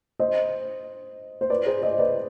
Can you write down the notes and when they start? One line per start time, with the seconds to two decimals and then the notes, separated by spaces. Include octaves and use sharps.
0.20 C5 D#5
1.41 C5
1.50 B4 D5
1.66 G#4 C5
1.82 C5 D#5
1.99 B4 D5